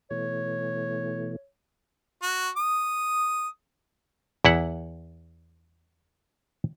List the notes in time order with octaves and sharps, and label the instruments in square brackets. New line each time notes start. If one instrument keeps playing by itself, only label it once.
[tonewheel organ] B2 E3 A3 [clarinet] C#5
[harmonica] F#4
D#6
[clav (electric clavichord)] E2 E4 F#5